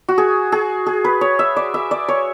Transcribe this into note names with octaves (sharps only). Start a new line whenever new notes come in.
F#4
G#4
G#4
G#4
B4
C#5
E5
D5
E5
D5
C#5